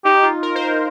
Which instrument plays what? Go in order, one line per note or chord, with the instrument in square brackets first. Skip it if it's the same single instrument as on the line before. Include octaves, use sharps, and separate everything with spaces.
[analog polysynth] D#4 [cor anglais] G4
[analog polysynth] F4
A#4
C5
A#4